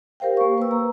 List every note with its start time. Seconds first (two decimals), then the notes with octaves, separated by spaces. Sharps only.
0.20 G4 A#4 C5 F5 G5
0.37 A#3 C#6
0.58 B4 E6
0.71 A#5